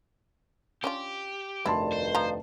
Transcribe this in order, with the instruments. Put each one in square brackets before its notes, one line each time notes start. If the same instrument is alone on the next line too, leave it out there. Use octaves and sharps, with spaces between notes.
[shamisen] C#4 D4 F4 [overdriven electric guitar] G4
[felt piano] F1 A5 C6 [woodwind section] D2 G2 D#3 [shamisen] E4
[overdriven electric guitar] C5
[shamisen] F3 A#5